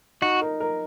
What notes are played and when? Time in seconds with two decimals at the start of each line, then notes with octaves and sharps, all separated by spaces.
0.22 D#4 F#4
0.41 A#4
0.60 A#4